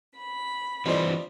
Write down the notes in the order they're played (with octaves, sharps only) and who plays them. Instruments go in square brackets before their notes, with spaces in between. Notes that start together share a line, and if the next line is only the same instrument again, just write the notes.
[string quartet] B5
[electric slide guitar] E3 G3 C4 [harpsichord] D4 F4 [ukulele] D#4 A4 C5